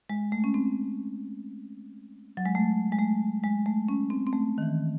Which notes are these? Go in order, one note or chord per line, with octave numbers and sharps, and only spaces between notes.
G#3
A3
C#4
C4
F#3
G#3
A3
G#3
A3
G#3
A3
C#4
C4
C4
A3
D#3
E3